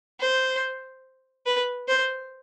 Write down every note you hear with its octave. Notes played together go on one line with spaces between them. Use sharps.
C5
B4
C5